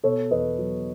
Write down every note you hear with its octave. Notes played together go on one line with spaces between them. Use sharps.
B2 A4 C#5
E2 B4 D#5
F#3